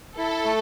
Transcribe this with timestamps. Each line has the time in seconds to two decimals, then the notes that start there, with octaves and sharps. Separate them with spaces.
0.18 E4 A4
0.45 A3